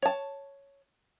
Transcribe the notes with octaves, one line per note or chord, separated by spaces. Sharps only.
C#5 A5